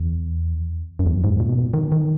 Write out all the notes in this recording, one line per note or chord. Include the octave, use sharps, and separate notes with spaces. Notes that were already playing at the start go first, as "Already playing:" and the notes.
Already playing: E2
F#2
E2
F#2
G#2
A#2
B2
D#3
D#3